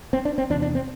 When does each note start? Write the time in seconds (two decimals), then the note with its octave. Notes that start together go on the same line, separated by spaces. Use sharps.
0.13 C4
0.25 D4
0.38 C4
0.50 E2 D4
0.54 C3
0.62 D4
0.75 C4